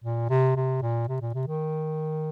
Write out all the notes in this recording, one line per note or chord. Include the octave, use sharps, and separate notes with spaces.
A#2
C3
C3
A#2
C3
A#2
C3
D#3